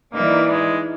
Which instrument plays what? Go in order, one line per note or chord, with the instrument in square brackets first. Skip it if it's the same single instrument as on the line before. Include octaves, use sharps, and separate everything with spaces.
[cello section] E3 D#4 D5 [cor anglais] A#3
[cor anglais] G#3